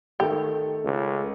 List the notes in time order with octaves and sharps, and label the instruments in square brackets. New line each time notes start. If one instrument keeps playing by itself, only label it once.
[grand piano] D#3 A3 [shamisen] G4
[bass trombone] C#2 [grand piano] A3